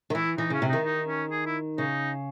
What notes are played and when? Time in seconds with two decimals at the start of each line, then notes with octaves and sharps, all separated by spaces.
0.10 D#3
0.15 E3 E4
0.38 E3 D#4
0.50 C#3 C#4
0.62 C3
0.69 D#3 D#4
0.85 D#4
1.07 C#4
1.31 G#4
1.46 E4
1.78 C#3 D#4